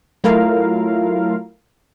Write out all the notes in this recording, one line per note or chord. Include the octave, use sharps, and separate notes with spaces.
F#3 A3 E4 F4 A#4 F5